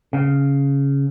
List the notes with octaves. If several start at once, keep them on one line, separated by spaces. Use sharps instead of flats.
C#3